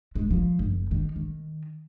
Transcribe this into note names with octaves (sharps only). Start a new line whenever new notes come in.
G#3
F3
F#1
D#3
D#3